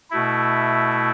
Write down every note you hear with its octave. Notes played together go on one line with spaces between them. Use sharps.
B2 A3 E4